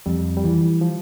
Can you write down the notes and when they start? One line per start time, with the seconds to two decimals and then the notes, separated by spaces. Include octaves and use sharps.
0.06 F2 G3
0.37 G3
0.43 E3 F3
0.81 F3